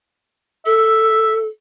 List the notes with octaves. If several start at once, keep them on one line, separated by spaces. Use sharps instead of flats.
A4 E5